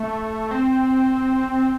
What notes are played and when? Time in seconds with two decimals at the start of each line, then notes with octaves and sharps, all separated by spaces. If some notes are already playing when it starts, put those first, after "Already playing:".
Already playing: A3
0.51 C4